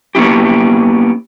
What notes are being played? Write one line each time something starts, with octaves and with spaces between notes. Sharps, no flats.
A#3 B3 C#4 E4 G4